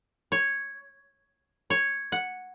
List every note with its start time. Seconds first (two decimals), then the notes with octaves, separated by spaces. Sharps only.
0.32 C#5
1.70 C#5
2.12 F#5